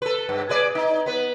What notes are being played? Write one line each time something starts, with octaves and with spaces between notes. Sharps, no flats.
A4 B4
G2
G#4 B4 D5
D#4
B3 B4